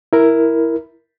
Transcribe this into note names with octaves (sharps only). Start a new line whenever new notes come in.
E4 A#4